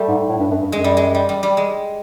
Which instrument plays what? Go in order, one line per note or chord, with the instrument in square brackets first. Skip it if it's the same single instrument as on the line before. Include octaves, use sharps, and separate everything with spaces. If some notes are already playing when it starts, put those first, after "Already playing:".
Already playing: [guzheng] G3 A3
[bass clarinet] G#2
A2
G2
F#2
G2
[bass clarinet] F#2 [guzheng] G#3
[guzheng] G3
G#3
G3
G3
G3
G#3